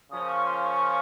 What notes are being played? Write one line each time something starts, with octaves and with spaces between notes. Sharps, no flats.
C#3 F3 A#3 C#4 F4 D#6
C#6
C6
C#6